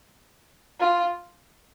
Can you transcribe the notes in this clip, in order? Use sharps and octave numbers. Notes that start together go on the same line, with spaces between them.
F4